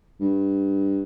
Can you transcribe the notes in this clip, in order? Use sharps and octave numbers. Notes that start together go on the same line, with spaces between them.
G2